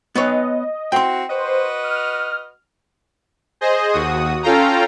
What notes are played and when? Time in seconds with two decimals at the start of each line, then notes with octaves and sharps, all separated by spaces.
0.15 B3 B4 C#5 D#5
0.92 C4 E4 F#4 G5 C6
1.30 F#4 B4 C5 D#5
1.84 F6
3.61 G#4 C5 D#5
3.92 D#2 F#4 D#6
4.43 C#4 F4 A4 F5 G5 A#5